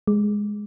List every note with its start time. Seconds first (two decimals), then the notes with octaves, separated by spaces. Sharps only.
0.07 G#3